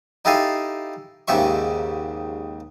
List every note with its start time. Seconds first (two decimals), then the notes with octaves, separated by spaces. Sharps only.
0.25 D#4 E4 G4 A4 F5 G#5
1.28 D#2 G#2 C#3 G4 E5 C#6